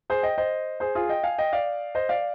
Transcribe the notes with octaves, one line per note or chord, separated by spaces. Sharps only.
G#4 C5
D#5 G5
C5 D#5
G#4 C5
F4 G#4
D#5 G5
F5 G#5
D#5 G5
D5 F5
C5 D#5
D5 F5